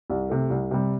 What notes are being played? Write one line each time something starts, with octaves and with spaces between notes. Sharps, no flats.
C2
C3 A3
C2
C3 G3